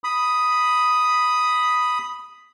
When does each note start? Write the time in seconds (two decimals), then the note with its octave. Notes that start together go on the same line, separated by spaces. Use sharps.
0.04 B5 D#6